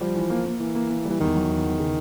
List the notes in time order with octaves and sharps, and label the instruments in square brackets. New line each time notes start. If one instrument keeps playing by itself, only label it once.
[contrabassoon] F3 [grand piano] G3
[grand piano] E3
A#3
A#3
[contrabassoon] E3 [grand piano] A#3
[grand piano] A#3
A#3
G3
[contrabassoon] E3
[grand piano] E2 [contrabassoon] D#3
[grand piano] F#3
E2
E2
C#3